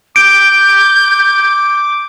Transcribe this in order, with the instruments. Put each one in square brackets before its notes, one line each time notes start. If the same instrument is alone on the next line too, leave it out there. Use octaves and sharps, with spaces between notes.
[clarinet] D6 [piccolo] G6 [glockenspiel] D7